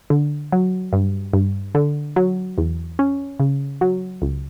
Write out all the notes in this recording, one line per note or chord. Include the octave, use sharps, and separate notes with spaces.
D3
F#3
G2
G2
D3
F#3
E2
C#4
C#3
F#3
C#2